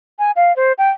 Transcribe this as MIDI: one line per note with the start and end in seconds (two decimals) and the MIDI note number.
0.19 0.31 80
0.36 0.55 77
0.56 0.73 72
0.78 0.89 79